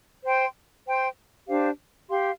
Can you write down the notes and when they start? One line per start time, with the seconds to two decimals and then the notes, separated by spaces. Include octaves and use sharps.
0.24 C5 G5 C6
0.86 C5 G5 C6
1.48 D4 G4 C5 F5
2.09 G4 F5 C6